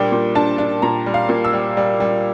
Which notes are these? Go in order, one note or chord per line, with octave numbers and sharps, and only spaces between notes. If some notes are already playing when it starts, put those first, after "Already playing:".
Already playing: A#2 G3 D4 G5
A#2
D4 A5
D4
A#2 A#5
G3
F5
A#2
E6
G3
G3
G3